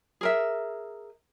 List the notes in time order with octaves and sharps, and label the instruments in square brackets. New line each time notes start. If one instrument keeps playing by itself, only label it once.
[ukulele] G#4 A#4 E5